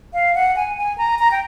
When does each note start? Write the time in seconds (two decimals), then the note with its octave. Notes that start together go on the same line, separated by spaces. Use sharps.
0.14 F5
0.35 F#5
0.56 G#5
0.77 G#5
0.98 A#5
1.19 A#5
1.31 G5